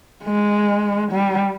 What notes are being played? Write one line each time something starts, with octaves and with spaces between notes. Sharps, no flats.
G#3
G3